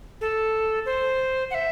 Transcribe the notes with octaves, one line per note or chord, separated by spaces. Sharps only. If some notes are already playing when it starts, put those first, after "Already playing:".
A4
C5
F#5
E5